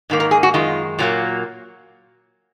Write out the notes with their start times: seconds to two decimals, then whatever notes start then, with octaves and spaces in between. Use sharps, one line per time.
0.10 G#2 D#3 A#3
0.20 A#4
0.31 G#4
0.43 F#4
0.54 F#2 D#3 G#3 F4
0.99 A#2 F#3 A#3